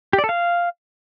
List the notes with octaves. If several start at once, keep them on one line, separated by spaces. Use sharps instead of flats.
G4
D5
A4
F5